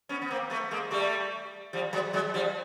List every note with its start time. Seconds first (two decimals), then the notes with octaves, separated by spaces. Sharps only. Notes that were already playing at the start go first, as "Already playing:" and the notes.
0.09 B3 C#4
0.22 B3
0.31 A#3 C4
0.50 A3 B3
0.71 G#3 A#3
0.91 G3 A3
1.73 F3 G3
1.93 F#3 G#3
2.13 F#3 G#3
2.34 F3 G3